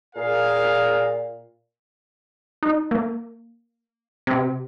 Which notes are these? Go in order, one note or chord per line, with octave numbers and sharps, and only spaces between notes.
A#2 G#4 A#4 F5
D#4
A#3
C3